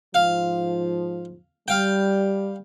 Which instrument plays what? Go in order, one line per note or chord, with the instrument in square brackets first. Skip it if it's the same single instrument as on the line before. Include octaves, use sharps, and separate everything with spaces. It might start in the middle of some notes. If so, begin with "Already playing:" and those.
[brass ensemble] G#2 F3 [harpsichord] F5
[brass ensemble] G3 [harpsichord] F5 G5